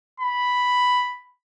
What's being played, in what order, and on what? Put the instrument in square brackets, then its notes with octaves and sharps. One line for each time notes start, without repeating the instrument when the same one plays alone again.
[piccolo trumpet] B5